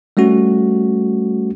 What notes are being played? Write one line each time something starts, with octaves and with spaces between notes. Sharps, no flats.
G3 A3 C#4 F#4